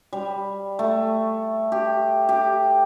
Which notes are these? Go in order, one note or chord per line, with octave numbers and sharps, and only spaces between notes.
G3
A3
G4
G4